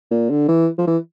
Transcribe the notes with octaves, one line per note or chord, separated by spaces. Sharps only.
A#2
D3
E3
F3
E3